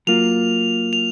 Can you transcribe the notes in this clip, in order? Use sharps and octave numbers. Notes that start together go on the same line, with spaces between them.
F#3 A#3 F4 F7
F7